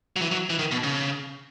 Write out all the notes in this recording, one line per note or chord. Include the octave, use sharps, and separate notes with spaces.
F#3
E3
F#3
E3
D#3
B2
C#3